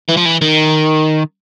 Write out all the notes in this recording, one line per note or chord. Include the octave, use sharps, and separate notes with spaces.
E3
F3
E3
D#3